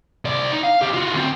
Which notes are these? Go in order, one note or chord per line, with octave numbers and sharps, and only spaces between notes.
C3 D5
D#4
F5
C#3 G4
F4 F#4
D2 C4